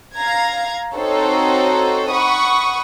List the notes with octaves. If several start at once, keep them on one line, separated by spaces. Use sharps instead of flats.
F5 A#5 G#6
C4 D#4 F#4 A4 C5 C#5
F#5 B5 C#6 D#6